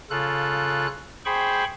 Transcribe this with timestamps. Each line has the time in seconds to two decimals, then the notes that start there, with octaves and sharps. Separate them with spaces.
0.10 C#3 F4 A4 F#6
1.25 G#4 C5 G5 B5 C#6